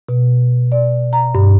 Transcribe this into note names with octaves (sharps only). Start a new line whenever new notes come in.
B2
D5
A#5
G2